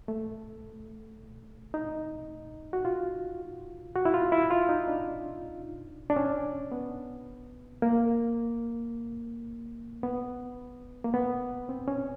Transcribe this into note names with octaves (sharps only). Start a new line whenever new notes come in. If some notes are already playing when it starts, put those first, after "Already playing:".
A3
D#4
F#4
F4
F#4
E4
F4
E4
F4
D#4
D4
D4
C#4
B3
A#3
B3
A#3
B3
C4
C#4